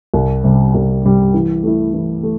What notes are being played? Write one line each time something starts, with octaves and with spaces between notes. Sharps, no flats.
C2
C3 G3
C2
C3 G3
E3
A3 E4
E3
A3